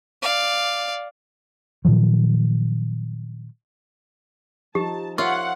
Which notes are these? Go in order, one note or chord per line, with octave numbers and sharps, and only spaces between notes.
D5 F5
A#2 D#3 F3 F#3
F3 D#4 G4 A5
F4 A#4 C#5 E5 F#5 C#6